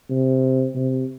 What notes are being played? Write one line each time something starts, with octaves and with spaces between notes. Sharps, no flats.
C3
C3